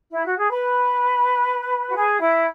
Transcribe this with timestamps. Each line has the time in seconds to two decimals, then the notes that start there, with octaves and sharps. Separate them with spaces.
0.11 E4
0.25 F#4
0.37 G#4
0.51 B4
1.89 F#4
1.96 G#4
2.20 E4